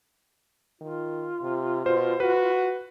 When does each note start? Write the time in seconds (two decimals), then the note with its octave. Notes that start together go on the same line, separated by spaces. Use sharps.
0.81 D#3 F4
1.42 C3
1.86 B2 C5
2.20 F#4 B4